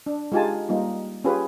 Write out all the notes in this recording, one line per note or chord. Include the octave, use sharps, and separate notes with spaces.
D4
G#3 D#4 F4 G4 G#5 A5
G3 A#3 D#4 F4
C#4 F4 G4 G#4 B4